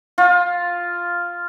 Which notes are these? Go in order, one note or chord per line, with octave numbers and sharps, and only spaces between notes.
F4